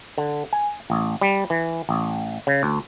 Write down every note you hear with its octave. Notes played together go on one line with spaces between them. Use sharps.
D3
G#5
A1
G3
E3
A1
C#3
D2